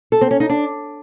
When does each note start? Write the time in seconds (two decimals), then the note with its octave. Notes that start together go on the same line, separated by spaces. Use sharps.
0.12 A4
0.21 C4
0.31 C#4
0.40 D#4
0.50 D4